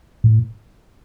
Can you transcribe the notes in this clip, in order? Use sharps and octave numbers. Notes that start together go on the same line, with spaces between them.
A2